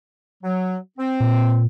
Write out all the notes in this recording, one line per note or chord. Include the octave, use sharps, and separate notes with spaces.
F#3
C4
A#2